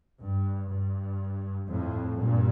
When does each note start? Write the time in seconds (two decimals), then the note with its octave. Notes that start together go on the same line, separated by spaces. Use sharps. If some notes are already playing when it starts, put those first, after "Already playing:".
0.21 G2
0.71 G2
1.69 F2 A2
2.18 G2 A#2